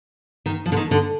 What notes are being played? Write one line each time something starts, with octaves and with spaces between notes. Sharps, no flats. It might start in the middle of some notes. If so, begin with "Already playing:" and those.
D#3
F3
D3
D#3
D3